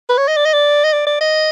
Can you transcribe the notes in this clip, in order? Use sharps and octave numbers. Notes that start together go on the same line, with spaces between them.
B4
C#5
D#5
D5
D#5
D5
D#5
D5
D5
D#5